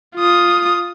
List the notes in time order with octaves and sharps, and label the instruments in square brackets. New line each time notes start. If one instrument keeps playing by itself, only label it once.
[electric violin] F4 D#6